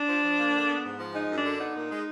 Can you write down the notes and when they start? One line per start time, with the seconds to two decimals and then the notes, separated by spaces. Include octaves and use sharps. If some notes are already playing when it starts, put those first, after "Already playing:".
Already playing: D4
0.08 F3
0.24 F3
0.39 A#3
0.53 D3
0.69 B3
0.84 G#2
0.99 F3
1.14 G#3 D#4
1.30 F#2
1.37 D4
1.45 D3
1.59 B3 D#4
1.76 A#2
1.90 G#3